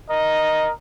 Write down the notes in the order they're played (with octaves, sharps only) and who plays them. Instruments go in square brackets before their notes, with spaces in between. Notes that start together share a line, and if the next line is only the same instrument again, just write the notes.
[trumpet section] A#4 D#5